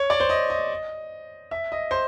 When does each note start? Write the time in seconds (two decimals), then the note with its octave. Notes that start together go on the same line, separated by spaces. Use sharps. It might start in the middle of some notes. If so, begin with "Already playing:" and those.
Already playing: C#5
0.10 D5
0.20 C5
0.29 D#5
0.50 D#5
1.51 E5
1.72 D#5
1.91 C5